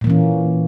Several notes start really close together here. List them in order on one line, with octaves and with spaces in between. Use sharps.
A#2 A#3 E3 C#4